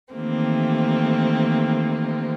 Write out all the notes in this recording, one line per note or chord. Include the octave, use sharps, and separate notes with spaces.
D#3 E3 A3 A#3 C4 G4